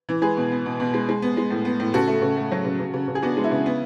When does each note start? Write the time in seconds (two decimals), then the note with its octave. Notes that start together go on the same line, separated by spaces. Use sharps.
0.09 E3
0.22 G#3 G#4 B4
0.37 B2
0.51 B3
0.66 B2
0.80 B2
0.94 G#3
1.09 G#3
1.22 B3
1.37 G#3
1.50 A2
1.65 B3
1.80 A2
1.94 C#3 F#4 A4
2.07 A3
2.22 C#3
2.36 A3
2.52 F#3
2.65 C#3
2.80 C#3
2.94 C#3
3.08 C#3
3.15 G#4
3.22 B3 D4 F#4
3.37 G#3
3.44 E4
3.51 C#3
3.66 B3